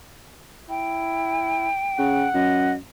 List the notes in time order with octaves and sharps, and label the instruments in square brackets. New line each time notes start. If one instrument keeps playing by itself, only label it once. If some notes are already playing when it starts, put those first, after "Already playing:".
[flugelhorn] E4 [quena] G5
[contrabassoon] C#3 [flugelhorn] F#5
[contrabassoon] F#2 [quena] D#5